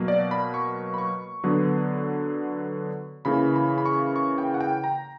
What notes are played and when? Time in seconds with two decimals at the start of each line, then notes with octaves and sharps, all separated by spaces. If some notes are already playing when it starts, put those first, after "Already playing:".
Already playing: B2 F#3 A#3
0.08 D5
0.31 B5
0.54 C#6
0.94 B5
0.98 C#6
1.44 D3 F#3 B3
3.25 C#3 E3 A#3 B5
3.56 B5
3.78 B5
3.86 C#6
4.16 C#6
4.38 G5
4.54 F#5
4.61 G5
4.84 A#5